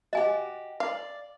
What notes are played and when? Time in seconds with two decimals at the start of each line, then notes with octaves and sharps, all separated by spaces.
0.13 F#4 G4 D#5 G#5
0.80 D5 F5